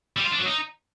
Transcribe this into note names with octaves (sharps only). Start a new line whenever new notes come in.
G3
F4
D4
F#3
D#4